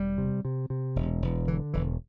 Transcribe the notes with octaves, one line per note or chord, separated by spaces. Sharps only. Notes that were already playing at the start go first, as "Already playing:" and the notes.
Already playing: E1 G3
C3
C3
C3
E1
E1
D3 E3
E1 E3